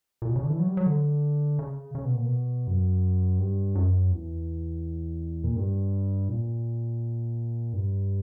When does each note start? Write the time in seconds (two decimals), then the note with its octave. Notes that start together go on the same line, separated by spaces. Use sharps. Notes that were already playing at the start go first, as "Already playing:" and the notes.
0.22 A#2
0.29 B2
0.35 C#3
0.43 D3
0.50 E3
0.59 F#3
0.68 G3
0.77 F#3
0.86 D3
1.59 C#3
1.95 C#3
2.05 B2
2.15 A#2
2.25 B2
2.67 F#2
3.39 G2
3.75 F#2
4.11 E2
5.44 A#2
5.56 G2
6.28 A#2
7.73 G2